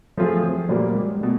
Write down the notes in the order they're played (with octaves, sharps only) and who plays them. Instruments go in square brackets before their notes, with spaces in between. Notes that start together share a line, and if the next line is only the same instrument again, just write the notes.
[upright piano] F3 A3 C4 F4 G#4 [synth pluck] F#3
[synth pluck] F3
[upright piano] A#2 G3 A#3 [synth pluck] F#3
[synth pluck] G#3
[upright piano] B2 [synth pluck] A3